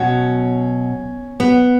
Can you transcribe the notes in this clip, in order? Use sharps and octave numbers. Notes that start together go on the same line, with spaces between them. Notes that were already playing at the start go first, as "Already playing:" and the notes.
Already playing: B2 F#3 C#4
B3